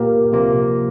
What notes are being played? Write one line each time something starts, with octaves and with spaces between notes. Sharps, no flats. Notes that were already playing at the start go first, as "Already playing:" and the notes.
Already playing: A#2 A#3 G4 A#4
C3 F3 A#3 F4